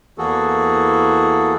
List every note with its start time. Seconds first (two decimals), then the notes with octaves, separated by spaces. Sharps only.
0.18 E2 E3 A#3 F#4 G#4 A4